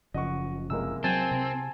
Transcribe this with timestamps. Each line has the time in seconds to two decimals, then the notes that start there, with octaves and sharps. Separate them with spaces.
0.14 F#1 C#3 F3 D#5 F#5 C#6
0.70 C2 G#3 A#3 E6
1.04 F#3 C4 G#5 A5
1.31 C3